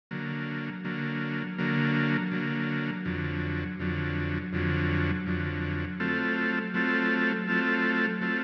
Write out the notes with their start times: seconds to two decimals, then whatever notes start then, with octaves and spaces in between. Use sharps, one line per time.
0.11 D3 F#3 A#3
0.85 D3 F#3 A#3
1.58 D3 F#3 A#3
2.32 D3 F#3 A#3
3.05 F2 D3 F#3
3.79 F2 D3 F#3
4.53 F2 D3 F#3
5.26 F2 D3 F#3
6.00 F#3 A3 C4 F4 A4
6.74 F#3 A3 C4 F4 A4
7.47 F#3 A3 C4 F4 A4
8.21 F#3 A3 C4 F4 A4